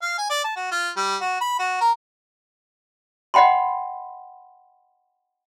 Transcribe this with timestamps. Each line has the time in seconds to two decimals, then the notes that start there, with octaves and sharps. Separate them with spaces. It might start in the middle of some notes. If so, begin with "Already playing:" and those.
0.02 F5
0.18 G#5
0.30 D5
0.44 A5
0.56 F#4
0.71 F4
0.97 G3
1.21 F#4
1.41 B5
1.59 F#4
1.81 A#4
3.34 D#5 F#5 G5 B5 C6